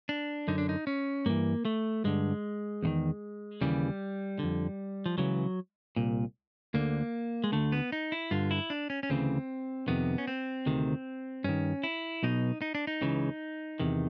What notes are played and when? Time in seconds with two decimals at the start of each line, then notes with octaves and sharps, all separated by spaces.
0.09 D4
0.48 F#2 D3 D#4
0.58 D4
0.69 D#4
0.87 C#4
1.26 G2 E3 A#3
1.65 A3
2.04 G2 D3 G#3
2.83 E2 C3 D#3
3.61 D#2 C#3 E3 G3
4.39 F2 D3
5.06 F3
5.18 C#2 C#3 E3 F#3
5.96 C2 A#2
6.74 D2 D3 A#3
7.44 G#3
7.52 D2 D3 A3
7.72 B3
7.92 D#4
8.12 E4
8.31 G2 D3 F4
8.51 E4
8.70 D4
8.90 C#4
9.03 C#4
9.10 D2 C#3 E3 C4
9.88 F2 C3 D#3 B3
10.18 C#4
10.27 C4
10.66 D2 C3 D#3
11.44 G2 D#3 C#4
11.83 E4
12.23 B1 B2 D#4
12.62 D#4
12.75 D4
12.87 D#4
13.01 C#2 C#3 E3
13.80 E2 C3 D#3